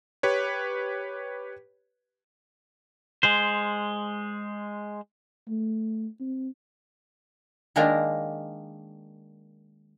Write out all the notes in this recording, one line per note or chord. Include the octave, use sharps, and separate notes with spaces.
G4 B4 C#5
G#3 C5
A3
C4
D#3 G#3 A#3 D4 F4 A#4